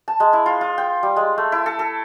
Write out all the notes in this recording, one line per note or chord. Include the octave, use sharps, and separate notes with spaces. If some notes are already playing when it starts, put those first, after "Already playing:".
A5
G#3
E4
F4
F4
G5
G3
G#3
A3
E4
A4
A4